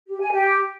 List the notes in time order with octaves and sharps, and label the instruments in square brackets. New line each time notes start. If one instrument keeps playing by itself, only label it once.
[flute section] G4
G#5
G4